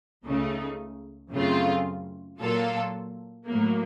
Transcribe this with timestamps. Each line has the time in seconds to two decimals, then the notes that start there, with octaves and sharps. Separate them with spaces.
0.25 C#2 C#3 A3 D#4
1.32 F#2 C#3 A3 C4 F4
2.39 A#2 F#3 A#3 F4 A4
3.46 A2 F#3 A#3